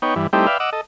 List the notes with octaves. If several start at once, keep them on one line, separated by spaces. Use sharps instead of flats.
B3 D#4 C#5 G5
G2 E3
G3 A3 C4 D#4 E4 G4
B4 D5 E5 F5 G5
D#5 F#5 D6 E6
A4 D#5